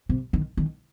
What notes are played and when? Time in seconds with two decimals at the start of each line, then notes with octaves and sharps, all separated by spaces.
0.09 C3
0.33 D#3
0.57 D#3